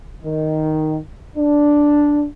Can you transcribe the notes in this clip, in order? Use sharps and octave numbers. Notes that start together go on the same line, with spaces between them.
D#3
D4